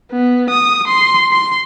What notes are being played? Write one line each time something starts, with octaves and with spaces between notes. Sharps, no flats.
B3
D#6
C6
C6